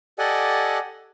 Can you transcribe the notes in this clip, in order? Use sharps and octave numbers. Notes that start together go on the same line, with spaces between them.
G4 A4 D5 D#5 F#5 G#5